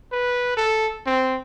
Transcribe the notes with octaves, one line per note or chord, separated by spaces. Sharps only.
B4
A4
C4